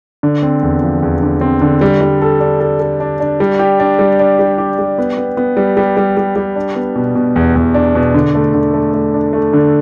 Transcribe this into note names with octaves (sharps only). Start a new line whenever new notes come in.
D3
C4
E2
F3
E2
D3
C4
D3
G3
G3
A4
D4
A4
A4
D4
D4
G3
G4
D4
G3
D4
G3
G4
G3
B3
B3
B3
G3
G3
G3
G3
G3
D4
B3
B2
B2
E2
E2
D4
B2
D3
A3
D3
A3
A3
D4
A3
D3